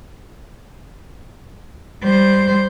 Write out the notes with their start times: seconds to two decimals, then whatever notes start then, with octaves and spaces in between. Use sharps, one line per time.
2.04 G3 C5